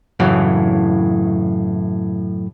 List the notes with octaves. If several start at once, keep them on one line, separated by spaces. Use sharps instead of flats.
F#2 A2 C#3 E3